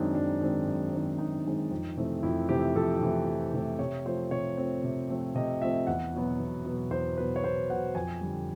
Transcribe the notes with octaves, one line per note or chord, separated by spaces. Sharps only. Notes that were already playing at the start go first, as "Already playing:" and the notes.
Already playing: F#2 D#3 G#3 C4 D4 D#4
F#2 D4
D#3 G#3 C4
F#2
D#3 G#3 C4
F#2 D#4
D#3 G#3 C4
F2
C3 E3 A3 C4
F2 E4
C3 E3 A3 C4 G4
F2 A4
C3 E3 A3 C4
F2
C3 E3 A3 C4
C3 C#5
F3 A3 C4 C5
C3 C#5
F3 A3 C4
C3
F3 A3 C4
C3 D#5
F3 A3 C4 E5
E2 F#5
B2 F#3 B3
E2
B2 F#3 B3
E2 C5
B2 F#3 B3 B4
C#5
E2 C5
B2 F#3 B3 F#5
F2 G#5
D3 G3